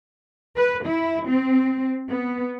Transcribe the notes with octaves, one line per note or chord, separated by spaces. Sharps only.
B4
E4
C4
B3